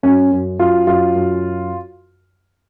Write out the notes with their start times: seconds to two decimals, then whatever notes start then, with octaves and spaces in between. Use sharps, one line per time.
0.03 F#2 C#4
0.31 F#2
0.59 F#2 F4
0.87 F#2 F4
1.15 F#2